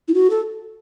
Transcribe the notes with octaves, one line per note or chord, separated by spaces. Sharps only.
E4
F#4
A4